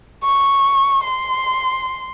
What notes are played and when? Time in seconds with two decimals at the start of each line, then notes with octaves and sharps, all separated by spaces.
0.24 C#6
1.04 C6